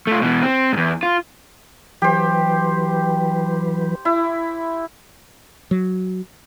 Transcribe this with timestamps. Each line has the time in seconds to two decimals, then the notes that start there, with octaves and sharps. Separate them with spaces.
0.07 A3 F4
0.22 B2 E3
0.43 C4
0.73 E2 G#2
1.03 F4
2.02 E3 F#3 G4 B4 C5
4.05 E4
5.71 F#3